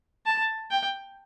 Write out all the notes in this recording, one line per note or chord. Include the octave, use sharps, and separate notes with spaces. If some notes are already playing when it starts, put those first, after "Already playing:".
A5
G5